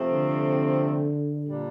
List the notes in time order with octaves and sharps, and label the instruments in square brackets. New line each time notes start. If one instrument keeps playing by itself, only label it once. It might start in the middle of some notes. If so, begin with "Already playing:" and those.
Already playing: [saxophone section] C3 F3 A3 C4
[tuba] D3
[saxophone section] A#2 G3 D4 F4